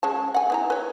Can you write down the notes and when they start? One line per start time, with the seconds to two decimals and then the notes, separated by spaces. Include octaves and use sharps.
0.03 G#3 C#4 A5
0.34 F#5 G#5
0.50 B3 E4 A#5
0.70 B4 C#5